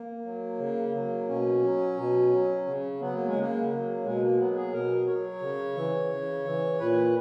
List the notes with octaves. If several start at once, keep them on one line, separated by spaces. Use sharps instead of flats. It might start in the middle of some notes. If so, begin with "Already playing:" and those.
Already playing: A#3
F#3
C#3
F#3
B2 C#4
F#3
B2
F#3
C#3
F#3 B3
A#3
G#3
C#3 A#3
F#3
B2 G#3
A#3
F#3 B3
G#4
B2 A#4
F#3 C#5
C#3
E3
C#3
E3
A#2 B4